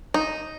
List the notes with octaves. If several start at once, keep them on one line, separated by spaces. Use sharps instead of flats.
D#4